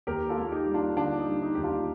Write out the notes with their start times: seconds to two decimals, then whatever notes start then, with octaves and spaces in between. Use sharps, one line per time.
0.07 D#2 G4 A#4
0.29 F4 A4
0.38 A#3
0.52 D#4 G4
0.66 G3
0.74 D4 F4
0.96 D3 D4 F4
1.19 D#4
1.27 G3
1.41 D#4
1.55 D#2 G4
1.64 D4 F4